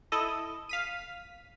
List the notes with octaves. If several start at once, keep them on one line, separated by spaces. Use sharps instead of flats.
E4 A4 D#5
F5 B6 D#7